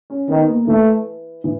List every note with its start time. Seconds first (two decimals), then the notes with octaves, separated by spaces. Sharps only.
0.10 C#4
0.29 D#3 B3
0.48 A#3
0.67 E3 A3
1.44 E3